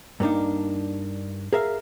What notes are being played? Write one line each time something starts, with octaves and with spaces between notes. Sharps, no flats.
G2 A#3 D4 D#4
G#4 A#4 E5 F5